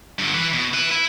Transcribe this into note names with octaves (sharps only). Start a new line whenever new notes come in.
G2 D3
E3 B4
B2
E4 B4
E4